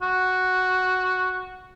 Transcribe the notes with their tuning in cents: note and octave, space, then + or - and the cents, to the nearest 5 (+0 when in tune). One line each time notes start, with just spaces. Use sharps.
F#4 +0